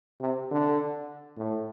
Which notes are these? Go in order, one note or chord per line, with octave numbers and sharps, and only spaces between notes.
C3
D3
A2